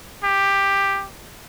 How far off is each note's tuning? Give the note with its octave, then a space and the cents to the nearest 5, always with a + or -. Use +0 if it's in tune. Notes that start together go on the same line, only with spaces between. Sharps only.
G4 +10